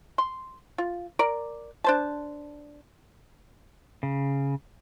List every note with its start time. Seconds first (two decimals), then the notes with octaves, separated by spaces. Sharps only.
0.18 C6
0.78 F4
1.19 A#4 D5
1.84 D4 C5 A5
4.03 C#3